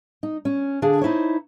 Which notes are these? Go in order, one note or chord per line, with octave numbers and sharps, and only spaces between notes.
D#4
C#4
D3 D4 G#4 F5
D#4 E4 C5 C#5